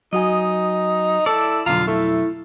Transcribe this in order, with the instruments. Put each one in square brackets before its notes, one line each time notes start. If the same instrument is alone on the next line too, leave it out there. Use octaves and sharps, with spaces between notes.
[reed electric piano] F#3 F#4 G#5 [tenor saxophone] D#4 [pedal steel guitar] D#5
[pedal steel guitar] E4 D5 [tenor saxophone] A4
[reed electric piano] F2 B2 F#3 [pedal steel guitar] D3 A#5 [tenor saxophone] F4
[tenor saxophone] A3 [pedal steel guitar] E4